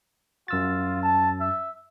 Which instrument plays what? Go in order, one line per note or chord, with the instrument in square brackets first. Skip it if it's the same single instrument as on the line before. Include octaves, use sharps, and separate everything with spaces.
[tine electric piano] F#2 E6 A6 [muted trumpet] F4
[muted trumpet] A5
E5